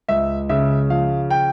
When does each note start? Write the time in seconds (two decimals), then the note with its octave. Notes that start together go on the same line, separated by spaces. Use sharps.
0.09 C#2 E5
0.49 C#3 E5
0.90 F3 F5
1.30 G5